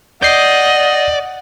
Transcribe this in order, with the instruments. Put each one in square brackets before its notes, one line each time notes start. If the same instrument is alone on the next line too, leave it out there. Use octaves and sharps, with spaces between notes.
[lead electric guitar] D5 [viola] D#5 [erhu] F#5 [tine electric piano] G6 C7